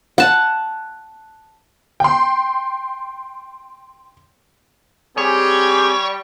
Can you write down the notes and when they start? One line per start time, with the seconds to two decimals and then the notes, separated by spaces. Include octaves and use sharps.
0.18 F#5 A5
2.00 G5 C6
5.18 G3 C4 G4 G#4 C#5